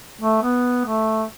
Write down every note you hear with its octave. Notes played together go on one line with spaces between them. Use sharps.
A3
B3
A3